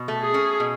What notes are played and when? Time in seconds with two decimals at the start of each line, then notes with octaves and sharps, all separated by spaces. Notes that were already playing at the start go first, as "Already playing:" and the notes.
Already playing: B2
0.08 A3
0.21 G#4
0.34 C#4
0.60 B2